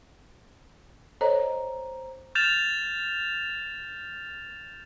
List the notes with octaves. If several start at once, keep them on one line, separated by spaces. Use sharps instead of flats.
A4 C5 C#5 D#5 A#5
F6 G6 A6 E7 F7